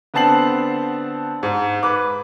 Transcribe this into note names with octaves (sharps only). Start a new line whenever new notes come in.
D3 B3 C4 A5 C7 F#7
G#2
B4 D6